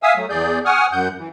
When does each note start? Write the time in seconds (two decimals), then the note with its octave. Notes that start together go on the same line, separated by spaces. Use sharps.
0.03 E5 F5 G#5 D#6 E6
0.17 F#3 A3
0.29 E2 G#4 D5 G6
0.65 F#5 G#5 C#6 D#6 F6
0.92 F#2 F#5 G6
1.18 E3